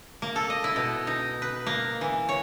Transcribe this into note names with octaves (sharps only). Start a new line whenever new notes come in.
A#3
A4
D#5
E4
B2
D#4
B4
A#3
E3
C#5